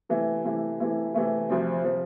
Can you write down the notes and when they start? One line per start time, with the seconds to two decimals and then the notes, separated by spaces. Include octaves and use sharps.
0.09 C3 E3 A3 E4
0.45 C3 E3 A3 E4
0.80 C3 E3 A3 E4
1.14 C3 E3 A3 E4
1.50 D2 C3 F3 C4
1.84 C3 F3 C4